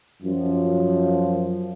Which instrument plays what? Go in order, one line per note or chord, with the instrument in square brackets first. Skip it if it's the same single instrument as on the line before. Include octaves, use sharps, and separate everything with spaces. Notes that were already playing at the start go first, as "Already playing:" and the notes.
[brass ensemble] F#2 F3